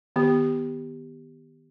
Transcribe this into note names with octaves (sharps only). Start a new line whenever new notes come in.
D#3 B3 G4